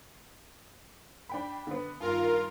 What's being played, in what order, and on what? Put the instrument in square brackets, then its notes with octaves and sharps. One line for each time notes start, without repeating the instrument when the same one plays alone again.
[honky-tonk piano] D4 G5 B5
D3 B3
[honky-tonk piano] G2 D#3 [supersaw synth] F4 A#4